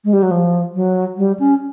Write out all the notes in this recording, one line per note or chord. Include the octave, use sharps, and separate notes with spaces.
G#3
G3
F#3
F3
F#3
G3
C#4